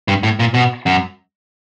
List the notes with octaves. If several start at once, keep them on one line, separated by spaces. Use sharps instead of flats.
G2
A2
A#2
B2
F#2